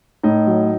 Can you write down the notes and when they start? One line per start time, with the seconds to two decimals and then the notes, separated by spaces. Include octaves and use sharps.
0.23 A2 D#4 D#5
0.47 F#3